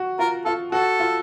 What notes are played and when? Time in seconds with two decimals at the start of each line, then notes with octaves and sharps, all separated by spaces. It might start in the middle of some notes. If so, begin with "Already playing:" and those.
Already playing: F#4
0.19 F4 A#4
0.45 F4 A4
0.72 F#4 A4
1.00 F4